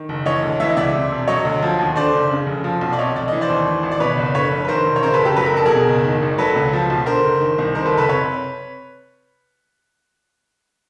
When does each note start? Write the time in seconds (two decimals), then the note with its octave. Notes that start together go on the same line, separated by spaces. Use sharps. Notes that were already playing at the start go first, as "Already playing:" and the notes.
Already playing: D#3
0.09 F#1
0.26 E3 C#5 D#5
0.42 D2
0.60 E3 E5
0.69 D#5
0.77 C#2 D5 E5
0.95 C3
1.12 E1
1.28 F#3 C#5 D#5
1.45 D2
1.62 F3
1.79 D#2
1.96 D3 C5 D5
2.13 F#1
2.31 C#3
2.47 F1
2.64 F3
2.81 B1
2.93 D5
2.99 C3 C#5 D#5
3.15 F1 D5
3.28 E3 D#5
3.41 C5 D5
3.49 D#2
3.67 E3
3.83 G#1
3.91 D5
4.00 B2 B4 C#5
4.17 F#1
4.35 D3 B4 C#5
4.52 F1
4.65 B4
4.68 D#3 A#4 C5
4.86 E1
4.96 C#5
5.03 C#3 A#4 C5
5.14 A4 B4
5.19 F#1
5.25 G4 A4
5.36 F#3 B4
5.46 A#4
5.54 A#1 A4
5.66 G#4 A#4
5.71 B2
5.88 F#1
6.04 D#3
6.22 G#1
6.38 F#3 A4 B4
6.56 C#2
6.73 F3
6.90 B1
7.06 D3 A#4 C5
7.24 F#1
7.41 D#3
7.59 C2
7.75 D#3 A#4 C5
7.86 A4 B4
7.92 F#1
7.97 A4 B4
8.08 C3 B4 C#5